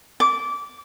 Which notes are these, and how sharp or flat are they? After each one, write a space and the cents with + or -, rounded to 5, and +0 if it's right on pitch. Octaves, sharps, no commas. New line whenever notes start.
D6 -20